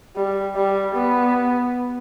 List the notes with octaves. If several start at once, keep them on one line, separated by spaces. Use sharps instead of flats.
G3
G3
B3